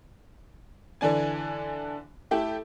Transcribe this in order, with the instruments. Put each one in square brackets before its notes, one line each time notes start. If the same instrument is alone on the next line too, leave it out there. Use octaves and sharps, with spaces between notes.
[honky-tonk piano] D3 E3 D4 G#5
A3 E4 G4 A4